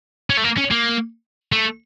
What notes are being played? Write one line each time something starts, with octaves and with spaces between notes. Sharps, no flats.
C#4
A3
A#3
C#4
A#3
A3